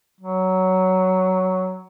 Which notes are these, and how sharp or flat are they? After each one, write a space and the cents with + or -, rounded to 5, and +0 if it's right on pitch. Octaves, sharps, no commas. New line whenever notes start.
F#3 +10